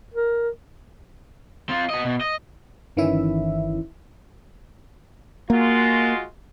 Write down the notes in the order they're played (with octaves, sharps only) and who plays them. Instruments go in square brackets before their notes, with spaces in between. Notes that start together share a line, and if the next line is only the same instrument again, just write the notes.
[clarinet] A#4
[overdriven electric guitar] C4 F4
B3 D#5
B2
D#5
[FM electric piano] G1 D#3 E3 C#4 E4 E5
[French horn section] G#3 F4 F#4 [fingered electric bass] A#3